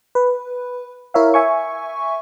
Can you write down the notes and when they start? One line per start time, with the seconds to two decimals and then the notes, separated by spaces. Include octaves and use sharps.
0.15 B4
1.14 E4 A#4 C#5 E5 F5
1.34 E5 G#5 C#6